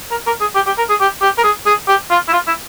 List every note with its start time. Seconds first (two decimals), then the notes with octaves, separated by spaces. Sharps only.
0.11 A#4
0.27 A#4
0.41 G#4
0.55 G4
0.67 G4
0.78 A#4
0.90 G#4
1.01 G4
1.22 G4
1.38 A#4
1.44 G#4
1.66 G#4
1.88 G4
2.11 F4
2.28 E4
2.33 F4
2.47 E4